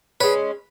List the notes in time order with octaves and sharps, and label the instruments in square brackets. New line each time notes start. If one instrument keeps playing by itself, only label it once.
[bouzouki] G#3 C#4 [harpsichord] B4